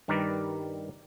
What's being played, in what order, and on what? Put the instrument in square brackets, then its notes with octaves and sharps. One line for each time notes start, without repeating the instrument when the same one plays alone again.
[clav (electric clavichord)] G2 D#3 G3 A#4 B4 D5